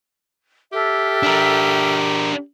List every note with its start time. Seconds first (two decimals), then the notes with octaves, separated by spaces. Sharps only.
0.72 G4 A4 E5 F6
1.23 D4 A#4